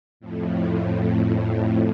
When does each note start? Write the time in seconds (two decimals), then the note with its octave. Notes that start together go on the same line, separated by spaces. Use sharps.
0.20 F2 A2